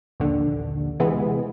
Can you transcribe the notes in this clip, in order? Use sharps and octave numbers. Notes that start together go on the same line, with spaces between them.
A#1 D#2 D3
C3 E3 G#3 B3